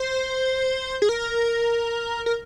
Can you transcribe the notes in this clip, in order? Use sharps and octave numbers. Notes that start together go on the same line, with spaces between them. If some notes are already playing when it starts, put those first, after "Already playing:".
Already playing: C5
G#4
A#4
A#4